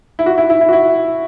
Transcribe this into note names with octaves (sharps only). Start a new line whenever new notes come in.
E4
F#4
E4
E4
E4
F#4
E4